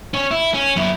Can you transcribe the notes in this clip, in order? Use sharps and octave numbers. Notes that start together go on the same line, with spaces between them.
C#4 C#5
E4
C#4
F#2 E4